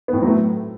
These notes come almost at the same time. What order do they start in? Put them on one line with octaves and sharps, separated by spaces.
B3 A2 C4 F#3 A3